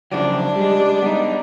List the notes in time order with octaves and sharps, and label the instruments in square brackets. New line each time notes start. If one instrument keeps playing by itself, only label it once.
[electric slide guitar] C#3 F3 F#3 [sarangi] D4
[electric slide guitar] G3 G#3
B3 D#4